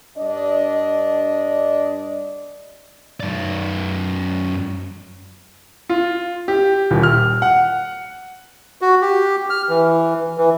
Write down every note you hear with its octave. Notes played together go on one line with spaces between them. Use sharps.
G2 D4 D5 D#5
F#2 D5
F4
G4
D#1
F6
F#5
F#4
G4
F6
E3
E3